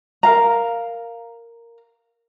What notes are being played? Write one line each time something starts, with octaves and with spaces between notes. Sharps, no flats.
A#4 F5 A#5